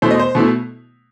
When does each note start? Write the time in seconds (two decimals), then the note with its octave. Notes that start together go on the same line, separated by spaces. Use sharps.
0.02 B2 A3 E4 C5
0.11 D#5
0.19 C5
0.35 B2 A3 E4